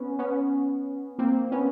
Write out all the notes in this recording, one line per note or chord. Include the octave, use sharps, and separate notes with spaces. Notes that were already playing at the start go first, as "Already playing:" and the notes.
Already playing: B3 C#4
B3 C#4
A#3 C4
B3 C#4